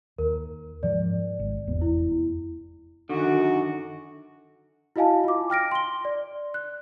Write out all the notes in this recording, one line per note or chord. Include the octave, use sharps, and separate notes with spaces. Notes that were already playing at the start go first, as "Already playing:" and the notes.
D#2 A#4
G#2 F3 D5
G#1
F1 E2 B3
E4
F#2 D3 D#3 F#4
E4 F#4 D#5 F5 G#5 A5
F4 D6
G5 F6 A#6 D7
C6 G7
D5
F#6